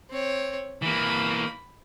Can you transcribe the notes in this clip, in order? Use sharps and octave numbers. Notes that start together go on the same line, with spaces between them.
C4 C#5
E3 A#3 B5